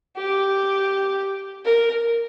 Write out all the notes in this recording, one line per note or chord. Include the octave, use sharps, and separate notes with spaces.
G4
A#4